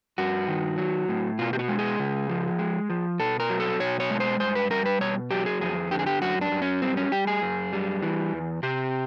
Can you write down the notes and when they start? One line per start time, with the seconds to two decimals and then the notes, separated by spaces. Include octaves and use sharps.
0.18 G2 F#4
0.48 D#3
0.78 F#3
1.08 A2
1.39 B2 F4
1.53 G4
1.59 F#4
1.68 G#3
1.79 G#4
1.99 C#3
2.29 F3
2.59 G#3
2.90 F3
3.19 B2 A4
3.40 A#4
3.50 F#3
3.60 A4
3.80 B2 C#5
4.00 C#5
4.11 G#3
4.20 C5
4.40 G2 C5
4.55 B4
4.71 G3 A#4
4.86 B4
5.01 B2 C#5
5.31 F#3 G4
5.46 G#4
5.61 F2 G#4
5.91 D3 G4
5.99 G#4
6.07 G4
6.22 F#2 F#4
6.41 D4
6.52 F#2
6.62 C#4
6.82 G3 C4
6.97 C#4
7.12 G3 G4
7.27 G#4
7.42 F#2
7.73 G3
8.02 E3
8.33 E2
8.63 C3 G4